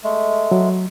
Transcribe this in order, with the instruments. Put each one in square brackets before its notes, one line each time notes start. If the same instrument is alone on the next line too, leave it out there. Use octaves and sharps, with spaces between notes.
[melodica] G#3 A3
[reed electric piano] F#3